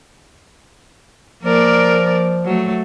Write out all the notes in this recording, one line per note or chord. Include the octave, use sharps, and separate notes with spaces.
F3 A#3 A#4 D5
F#3 A3